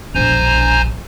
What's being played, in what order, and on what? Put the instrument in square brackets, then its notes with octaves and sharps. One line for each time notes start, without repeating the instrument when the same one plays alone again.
[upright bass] E1 A#1 [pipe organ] C5 G#5 A#5